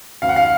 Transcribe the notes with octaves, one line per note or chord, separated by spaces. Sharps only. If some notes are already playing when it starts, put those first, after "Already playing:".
D2 F5
F#5
F5